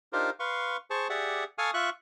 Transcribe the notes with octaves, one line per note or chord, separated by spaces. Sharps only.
D4 D#4 F4 G4 A#4 C5
B4 F5 C6 C#6
G#4 C5 A5 C#6
G4 G#4 D5 E5 F#5
A4 F5 G#5 C#6 D#6 F6
F4 E5 C#6 F#6